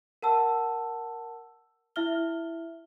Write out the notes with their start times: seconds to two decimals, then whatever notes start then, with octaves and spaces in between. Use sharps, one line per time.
0.22 A#4 F#5 A5 E6
1.96 E4 E5 F6 G7